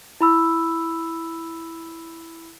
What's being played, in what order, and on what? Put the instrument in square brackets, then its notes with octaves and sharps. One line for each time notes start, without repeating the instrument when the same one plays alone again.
[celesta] E4 B5 E6